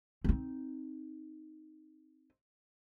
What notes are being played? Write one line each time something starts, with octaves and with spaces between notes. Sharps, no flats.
C4 D#4